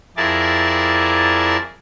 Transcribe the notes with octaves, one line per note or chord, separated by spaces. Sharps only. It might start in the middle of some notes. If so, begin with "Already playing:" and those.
F2 E4 G#4 A#4 D5 A5